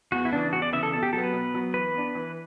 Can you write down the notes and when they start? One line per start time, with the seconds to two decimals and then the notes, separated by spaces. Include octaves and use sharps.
0.12 E2 F#4
0.25 E4
0.33 C#3 E3 D4
0.53 E2 F#4
0.62 D5
0.73 C#3 E3 E5
0.83 A4
0.93 B2 A4
1.03 G4
1.13 F#3 A4
1.18 B3
1.23 B4
1.33 B2
1.54 F#3 B3
1.74 E3 B4
1.94 B3 D4
2.15 E3